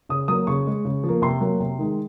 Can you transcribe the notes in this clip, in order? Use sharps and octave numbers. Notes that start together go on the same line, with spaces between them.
C#3 D#6
F#3 A#3 D#6
C#3 C#6
G#3
C#3
F3
A#3
C3 C6
F#3 A#3
C3
D#3 G#3